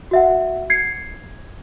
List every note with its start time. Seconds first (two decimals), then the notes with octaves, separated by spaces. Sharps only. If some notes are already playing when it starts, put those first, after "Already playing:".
0.11 F#4 E5 F#5
0.70 G#6 C7 C#7